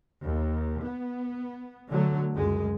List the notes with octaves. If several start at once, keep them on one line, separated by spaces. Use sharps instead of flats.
D#2
B3
D3 F#3 A3
C#2 F#2 G#3